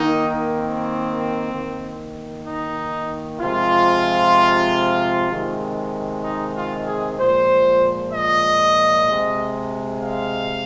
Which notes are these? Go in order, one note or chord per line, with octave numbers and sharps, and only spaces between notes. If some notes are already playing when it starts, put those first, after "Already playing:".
Already playing: D#3 A#3 D#4
C4
D#3 A#3
D#4
C3 F3 G#3 F4
C3 D#3 G#3
D#4
F4
G#4
A#2 F3 G#3 C5
D#5
C3 G#3
F5